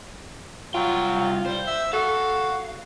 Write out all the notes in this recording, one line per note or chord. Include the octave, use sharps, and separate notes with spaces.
C2 F#3 F4 G5
G3 C5
E5
F#4 A4 F5